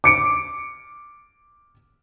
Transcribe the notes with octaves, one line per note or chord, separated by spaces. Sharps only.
D6 C#7 D7